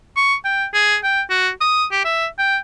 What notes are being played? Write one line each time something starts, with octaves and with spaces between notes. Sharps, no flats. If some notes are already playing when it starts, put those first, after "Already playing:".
C#6
G5
G#4
G5
F#4
D#6
G4
E5
G5